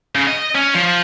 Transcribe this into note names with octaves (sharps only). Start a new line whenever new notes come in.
C#3
D#5
C#4
F3